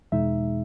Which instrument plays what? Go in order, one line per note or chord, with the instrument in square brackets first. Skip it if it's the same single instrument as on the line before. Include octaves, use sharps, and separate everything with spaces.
[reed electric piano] E2 B2 G#3 D#4 E5